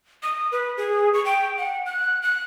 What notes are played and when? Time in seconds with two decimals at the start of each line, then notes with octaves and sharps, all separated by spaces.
0.23 D#6
0.52 B4
0.77 G#4
1.14 C#6
1.25 G5
1.58 F#5
1.86 F#6
2.22 F#6